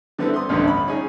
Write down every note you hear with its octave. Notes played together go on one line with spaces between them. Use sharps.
D3 G3 B3 C4 E4 A4
C6 D#6
A1 D2 G2 D3 A3
B5
C#4 D#4 G#4